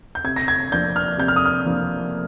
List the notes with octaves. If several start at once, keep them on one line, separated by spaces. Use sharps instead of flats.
G6
C3 G#6
A#6
G#6
F3 A#3 D4 G6
F6
C3 G6
F6
D#6
F6
F3 A#3 D4